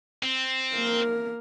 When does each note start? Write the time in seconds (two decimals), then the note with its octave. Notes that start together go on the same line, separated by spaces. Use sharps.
0.23 C4
0.74 A#3 A#4